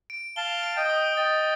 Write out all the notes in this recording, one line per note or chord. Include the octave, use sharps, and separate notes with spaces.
D7
F5 A5 G7
D7
D#5 G5
D#6
D#5 G5 A6